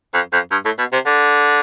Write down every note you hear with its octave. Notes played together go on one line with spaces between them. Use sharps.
F2
F2
G2
A2
B2
C3
D3